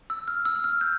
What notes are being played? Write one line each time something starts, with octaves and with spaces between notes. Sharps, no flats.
E6
F6
E6
E6
F6
G6